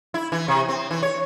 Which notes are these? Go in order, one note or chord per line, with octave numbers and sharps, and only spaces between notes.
E4
E3
C3
C4
E3
C#5